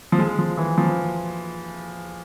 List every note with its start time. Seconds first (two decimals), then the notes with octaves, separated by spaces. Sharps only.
0.12 F3
0.18 G#3
0.38 F3
0.57 E3
0.78 F3